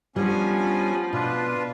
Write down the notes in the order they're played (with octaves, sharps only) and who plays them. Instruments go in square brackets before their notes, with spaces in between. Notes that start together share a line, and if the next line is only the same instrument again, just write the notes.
[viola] F3 [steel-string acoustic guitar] G3 D4 [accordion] B3 C#4 G#5
[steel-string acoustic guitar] B2 [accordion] D4 F4 B4